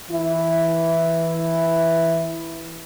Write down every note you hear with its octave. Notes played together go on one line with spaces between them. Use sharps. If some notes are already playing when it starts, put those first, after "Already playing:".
E3 E4